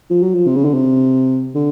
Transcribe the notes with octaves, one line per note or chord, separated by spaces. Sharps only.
F3
F#3
F3
C3
C#3
D3
C3
D3